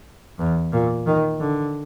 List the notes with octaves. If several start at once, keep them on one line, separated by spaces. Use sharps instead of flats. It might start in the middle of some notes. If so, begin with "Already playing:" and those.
E2
A#2
D#3
D3